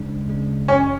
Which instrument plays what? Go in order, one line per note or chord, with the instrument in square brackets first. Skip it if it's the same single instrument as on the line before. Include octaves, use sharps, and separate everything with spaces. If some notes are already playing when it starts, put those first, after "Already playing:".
Already playing: [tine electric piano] D2 C#3 G#3 D4
D2 C#3 G#3 D4
[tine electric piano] G#1 F#2 E3 [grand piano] C#4